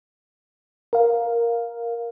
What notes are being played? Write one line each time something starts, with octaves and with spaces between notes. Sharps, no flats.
A#4 F5